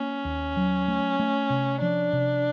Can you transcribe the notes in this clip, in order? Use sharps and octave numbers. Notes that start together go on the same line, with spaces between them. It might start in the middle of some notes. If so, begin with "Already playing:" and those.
Already playing: A#3 C#4
D#2
F#3
A3
A3
C3
F3 D4
C3